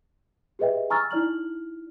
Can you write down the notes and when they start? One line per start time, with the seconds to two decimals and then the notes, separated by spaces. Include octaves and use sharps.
0.59 G4 G#4 B4 D#5 E5 G5
0.90 G#5 A#5 C#6 E6 F6 A6
1.11 D#4 E4 D5 F6 F#7